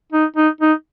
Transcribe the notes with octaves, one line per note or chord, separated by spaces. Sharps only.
D#4
D#4
D#4